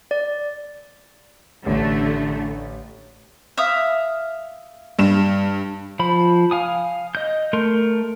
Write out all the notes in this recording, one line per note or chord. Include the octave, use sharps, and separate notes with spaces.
D5
A1 D3 A3
E5 F5 D#6
G2 E7
F3 C5 B5
F5 G#5 D#6
D#5 G6
A3 A#4 C6 G6